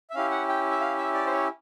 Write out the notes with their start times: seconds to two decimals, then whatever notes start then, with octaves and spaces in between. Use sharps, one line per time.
0.10 E5
0.15 C#4 E4 G4 F5
0.31 F#5
0.49 G5
0.71 E5
0.81 F5
0.98 E5
1.14 D5
1.26 C5
1.32 C#5